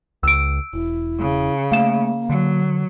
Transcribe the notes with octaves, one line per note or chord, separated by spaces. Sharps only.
C#2 E6 D7
E1 E4
C#3
A3 A#3 F5 E7
D3 F#3